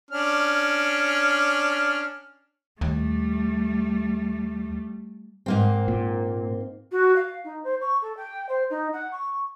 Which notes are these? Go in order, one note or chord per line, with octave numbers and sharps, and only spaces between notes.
C#4 D4 F6
D#2 G3 A3
G#2 A#3 C4
A#2
F#4
F5
D#4
C5
C#6
A4
G5
C5
D#4
F#5
C#6